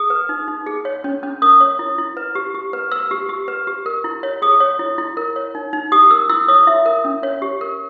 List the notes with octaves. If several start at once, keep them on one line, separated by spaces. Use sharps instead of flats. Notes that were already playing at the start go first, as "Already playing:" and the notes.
Already playing: G#4 D#6
B4
D#4
D#4
G#4
C#5
C#4
C#4
A#4 D#6
C#5
E4
E4
B4
G4
G4
B4
B4 E6
G4
G4
B4
G4
A#4
E4
C#5
G#4 D#6
C#5
E4
E4
A#4
C#5
D#4
D#4
G4 D#6
A#4 E6
E4 E6
C#5 D#6
E4 E5
A#4
C#4
C#5
G4
A#4